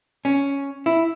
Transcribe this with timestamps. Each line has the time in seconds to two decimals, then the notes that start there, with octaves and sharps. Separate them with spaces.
0.25 C#4
0.86 E4